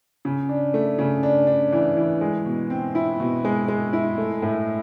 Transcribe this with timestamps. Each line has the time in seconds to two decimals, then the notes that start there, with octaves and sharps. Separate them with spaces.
0.25 C#3
0.49 D4
0.74 A3
0.99 C#3
1.23 D4
1.47 D4
1.72 E3
1.97 E3
2.21 G#3
2.46 B2
2.70 C4
2.95 E4
3.20 B2
3.45 G#3
3.68 G#3
3.93 E4
4.18 A3
4.42 A2